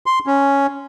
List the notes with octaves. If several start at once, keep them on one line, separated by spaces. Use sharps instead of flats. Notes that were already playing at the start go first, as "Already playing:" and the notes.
C6
C#4